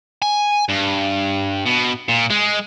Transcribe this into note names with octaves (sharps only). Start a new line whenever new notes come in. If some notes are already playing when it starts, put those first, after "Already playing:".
G#5
G2
B2
A#2
G#3